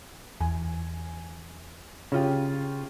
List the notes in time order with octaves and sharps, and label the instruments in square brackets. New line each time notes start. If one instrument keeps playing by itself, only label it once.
[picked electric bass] E2 [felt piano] G#5
[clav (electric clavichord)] C#3 [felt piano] C#4 F4 G4